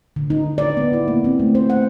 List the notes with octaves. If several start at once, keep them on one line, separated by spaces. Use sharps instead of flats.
D3
D#4
D5
B3
E4
A#3
C4
A3
C5
F#5